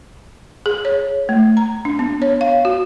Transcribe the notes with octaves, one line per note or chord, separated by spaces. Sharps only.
G#4
C#5
A3
A#5
D4
B3
C#5
F5
F#4